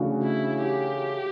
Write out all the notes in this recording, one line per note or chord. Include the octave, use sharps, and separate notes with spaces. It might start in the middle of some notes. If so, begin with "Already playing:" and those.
Already playing: C#3 E3 A3 D4 F#4
E4
G4